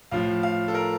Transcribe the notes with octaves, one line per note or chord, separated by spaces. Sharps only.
A2 F3 F5
F5
A4
A#4